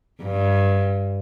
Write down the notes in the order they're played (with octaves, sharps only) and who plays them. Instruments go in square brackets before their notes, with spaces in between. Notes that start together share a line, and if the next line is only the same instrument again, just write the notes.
[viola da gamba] G2